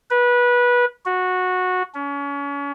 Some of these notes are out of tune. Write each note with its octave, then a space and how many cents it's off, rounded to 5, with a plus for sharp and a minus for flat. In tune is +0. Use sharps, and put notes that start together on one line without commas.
B4 -20
F#4 -15
C#4 +35